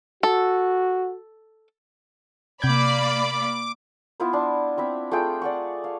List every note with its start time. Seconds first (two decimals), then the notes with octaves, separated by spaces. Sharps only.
0.23 F#4 A4
2.62 C3 A#3 D5 B5 D6 G6 G#6
4.20 B3 E4 F4 C5
4.33 D4
4.77 C4 E4 E5
5.11 A3 F4 G#4 G5
5.42 D5 F#5 C#6
5.84 F5